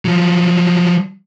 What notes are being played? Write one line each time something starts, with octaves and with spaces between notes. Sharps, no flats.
F3 F#3